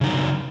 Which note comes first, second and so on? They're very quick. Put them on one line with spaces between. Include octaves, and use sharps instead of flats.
C#3 D#4 F#3